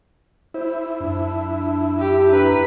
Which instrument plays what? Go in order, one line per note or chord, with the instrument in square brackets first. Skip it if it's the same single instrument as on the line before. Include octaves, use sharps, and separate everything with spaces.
[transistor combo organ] E4 [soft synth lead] C5
[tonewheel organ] F#2 [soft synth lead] D4
[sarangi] G4
[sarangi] B4 [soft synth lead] A#5